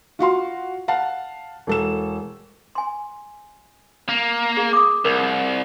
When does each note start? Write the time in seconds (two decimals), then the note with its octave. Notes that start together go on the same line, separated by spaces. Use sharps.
0.19 F4 F#4 F5 C6
0.88 F5 F#5 A5
1.67 E1 A4 E7
2.75 G#5 C6
4.09 A#3
4.57 G#4
4.73 D6 D#6
5.05 C2 A#4